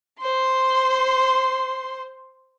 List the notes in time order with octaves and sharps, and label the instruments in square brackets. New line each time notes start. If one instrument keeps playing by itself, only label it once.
[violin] C5 C6